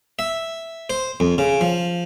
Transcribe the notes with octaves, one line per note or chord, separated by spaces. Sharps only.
E5
C5
F2
C#3
F3